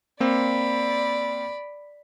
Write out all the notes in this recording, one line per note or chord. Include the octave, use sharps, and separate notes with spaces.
A#3 C4 D5 B5